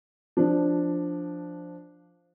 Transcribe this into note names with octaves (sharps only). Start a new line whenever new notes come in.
F3 D4